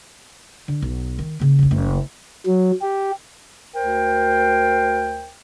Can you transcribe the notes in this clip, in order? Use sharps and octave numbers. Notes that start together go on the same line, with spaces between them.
D3
B1
D#3
C#3 A#3
E1 C#3
F#1 A3
F#3
G4
D2 A#4 C5 G5